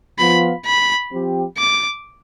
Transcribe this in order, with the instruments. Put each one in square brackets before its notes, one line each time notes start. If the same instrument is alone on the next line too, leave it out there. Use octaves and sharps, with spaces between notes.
[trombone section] F3 B3 F4 [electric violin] B5
[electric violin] B5
[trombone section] F3 C4 G4
[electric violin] D6